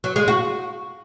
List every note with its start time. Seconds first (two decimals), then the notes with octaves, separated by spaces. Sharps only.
0.04 F#3
0.16 G#3
0.28 F#4